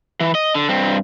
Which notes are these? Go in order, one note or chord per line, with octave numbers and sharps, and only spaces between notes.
E3
D#5
D3
G2 C4